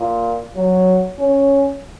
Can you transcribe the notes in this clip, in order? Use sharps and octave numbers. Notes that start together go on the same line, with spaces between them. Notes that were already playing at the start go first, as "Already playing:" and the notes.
Already playing: A#2
F#3
C#4